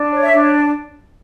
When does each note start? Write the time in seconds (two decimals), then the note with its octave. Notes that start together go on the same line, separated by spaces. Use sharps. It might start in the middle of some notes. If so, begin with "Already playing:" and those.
Already playing: D4
0.12 C#5
0.22 E5
0.32 D4